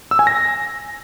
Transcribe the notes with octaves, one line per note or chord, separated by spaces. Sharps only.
E6
G#5
A#6